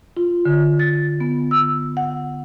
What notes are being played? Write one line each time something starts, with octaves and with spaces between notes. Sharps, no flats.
F4
D3
A6
B3
E6
F#5